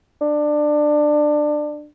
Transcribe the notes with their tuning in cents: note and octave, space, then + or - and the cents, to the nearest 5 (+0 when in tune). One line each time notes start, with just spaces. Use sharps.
D4 +20